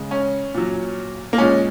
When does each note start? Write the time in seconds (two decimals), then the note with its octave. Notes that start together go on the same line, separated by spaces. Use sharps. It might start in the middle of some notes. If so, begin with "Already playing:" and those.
Already playing: C#3 G#3
0.11 C#4
0.54 A#2 F#3
1.33 A#3
1.38 A#2 G#3 C#4